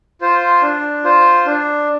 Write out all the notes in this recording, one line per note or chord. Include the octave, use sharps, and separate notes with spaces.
F4 C5
D4
F4 C5
D4